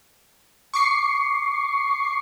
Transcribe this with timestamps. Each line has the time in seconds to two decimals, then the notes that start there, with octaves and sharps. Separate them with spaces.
0.74 C#6 D6 C7 C#7